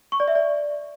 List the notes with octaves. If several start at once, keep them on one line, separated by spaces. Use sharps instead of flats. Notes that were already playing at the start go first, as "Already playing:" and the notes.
C#6
D5
E5
D5